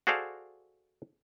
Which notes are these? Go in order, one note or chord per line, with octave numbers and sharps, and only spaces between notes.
F#4 G#4 A4 C5 D5 F5